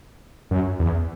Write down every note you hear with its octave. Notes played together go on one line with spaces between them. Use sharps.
F#2
E2